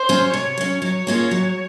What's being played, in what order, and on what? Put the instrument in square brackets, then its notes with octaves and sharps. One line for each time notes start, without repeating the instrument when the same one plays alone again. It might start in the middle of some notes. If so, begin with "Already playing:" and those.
Already playing: [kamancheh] C5
[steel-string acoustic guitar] F#3 C#4
[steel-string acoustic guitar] C3 [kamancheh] C#5
[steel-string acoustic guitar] F#3 C#4
[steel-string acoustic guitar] F#3 [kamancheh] C#5
[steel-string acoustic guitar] A#3 C#4 F4 G#4
F#3